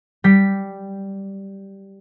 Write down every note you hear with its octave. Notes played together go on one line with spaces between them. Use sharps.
G3 G4 B6